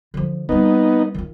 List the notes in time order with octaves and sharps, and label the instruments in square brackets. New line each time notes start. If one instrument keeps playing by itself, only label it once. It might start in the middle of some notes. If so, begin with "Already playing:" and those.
[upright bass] D3 F3
[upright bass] G3 C4 [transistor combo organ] B3 D#4
[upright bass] D#3 F4